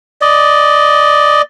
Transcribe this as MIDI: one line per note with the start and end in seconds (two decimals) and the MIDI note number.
0.22 1.42 74
0.22 1.42 75